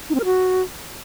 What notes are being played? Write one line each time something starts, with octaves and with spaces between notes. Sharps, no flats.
D#4
C4
A#4
F#4